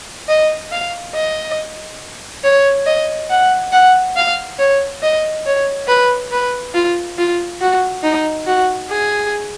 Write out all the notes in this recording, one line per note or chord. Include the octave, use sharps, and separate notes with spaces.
D#5
F5
D#5
C#5
D#5
F#5
F#5
F5
C#5
D#5
C#5
B4
B4
F4
F4
F#4
D#4
F#4
G#4